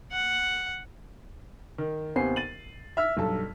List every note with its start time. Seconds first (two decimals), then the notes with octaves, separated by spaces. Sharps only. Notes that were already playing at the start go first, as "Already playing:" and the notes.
0.12 F#5
1.78 D#3
2.16 D#2 C3 B3 C5 G#5 C7
2.36 A6 D#7 F#7
2.97 E5 E6 F6 B6
3.17 B1 G2 A4 A5